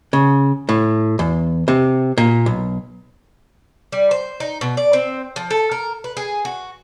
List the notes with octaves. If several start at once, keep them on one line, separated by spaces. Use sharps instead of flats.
C#3
A2
E2
C3
A#2
B1
G3
C5
D#4
B2
D5
C4
F3
A4
A#4
B4
G#4
F#4